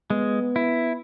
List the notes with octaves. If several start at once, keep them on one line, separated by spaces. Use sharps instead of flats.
G#3 B3
E4